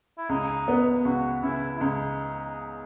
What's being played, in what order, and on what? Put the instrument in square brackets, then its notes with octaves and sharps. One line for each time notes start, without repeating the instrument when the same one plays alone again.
[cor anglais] E4
[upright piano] C#2 [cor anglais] D#4
[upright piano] B3
[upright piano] C#2 [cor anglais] F#4
[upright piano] C#3 [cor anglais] E4
[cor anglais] E4
[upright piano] C#2 [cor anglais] D#4